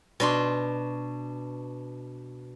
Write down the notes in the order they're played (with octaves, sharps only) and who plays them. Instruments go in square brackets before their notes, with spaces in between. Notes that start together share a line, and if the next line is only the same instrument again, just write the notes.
[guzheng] B2 D4 C6